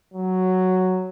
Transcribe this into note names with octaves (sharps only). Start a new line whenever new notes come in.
F#3